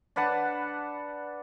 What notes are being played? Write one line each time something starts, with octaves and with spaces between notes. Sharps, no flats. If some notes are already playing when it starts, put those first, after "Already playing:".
D4 B4 F#5 A5